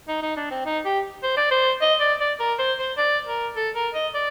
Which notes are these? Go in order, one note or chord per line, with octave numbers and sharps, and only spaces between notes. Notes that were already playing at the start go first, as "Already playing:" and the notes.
D#4
D#4
D4
C4
D#4
G4
C5
D5
C5
D#5
D5
D5
A#4
C5
C5
D5
A#4
A4
A#4
D#5
D5